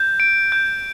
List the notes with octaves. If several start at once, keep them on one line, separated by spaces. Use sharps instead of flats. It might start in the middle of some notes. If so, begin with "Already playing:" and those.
Already playing: G6
D7
G6